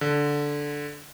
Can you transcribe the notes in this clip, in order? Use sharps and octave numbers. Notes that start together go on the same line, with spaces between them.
D3